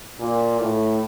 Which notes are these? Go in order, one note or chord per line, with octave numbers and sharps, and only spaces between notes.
A#2
A2